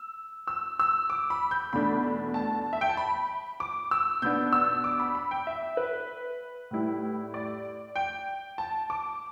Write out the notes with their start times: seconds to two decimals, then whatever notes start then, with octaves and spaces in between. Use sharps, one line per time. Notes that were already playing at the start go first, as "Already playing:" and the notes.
Already playing: E6
0.47 E6
0.79 E6
1.10 D6
1.30 B5
1.51 G6
1.73 E2 B2 A3 D4 B5
2.34 A5
2.73 E5
2.81 G5
2.89 A5
2.97 B5
3.60 D6
3.91 E6
4.22 B2 B3 D4 G6
4.53 E6
4.84 D6
5.00 B5
5.15 B5
5.31 G5
5.47 E5
5.77 B4
6.71 A2 G3 E4
7.34 D5
7.96 G5
8.58 A5
8.90 D6